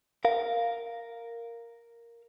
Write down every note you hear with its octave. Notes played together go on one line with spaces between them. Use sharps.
A#4 F5